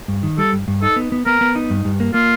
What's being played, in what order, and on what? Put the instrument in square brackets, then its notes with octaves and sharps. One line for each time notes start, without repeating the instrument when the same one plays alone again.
[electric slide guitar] G2
D#3
[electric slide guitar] G3 [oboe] A4
[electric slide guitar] G2
G2
[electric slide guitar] D#4 [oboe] A4
[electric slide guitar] B3
B3
[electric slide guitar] B3 [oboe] A#4
[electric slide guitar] B3
D#4
G2
G2
A#3
[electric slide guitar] A#3 [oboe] F4